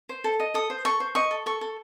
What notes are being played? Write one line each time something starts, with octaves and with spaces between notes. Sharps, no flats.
C5
A4
D#5
A4 D#6
C5
A4 C#6
C5
D#5 C#6
A4
A4 C#6
A4